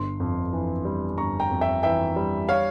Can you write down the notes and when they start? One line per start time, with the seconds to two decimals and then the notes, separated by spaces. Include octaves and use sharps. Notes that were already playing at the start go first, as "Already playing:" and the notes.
Already playing: G1 C6
0.20 F2
0.53 E3
0.85 G3
1.18 G1 A#5 C#6
1.40 G5 A#5
1.51 F2
1.61 E5 G5
1.83 E3 E5 G5
2.16 G3
2.49 C#5 F5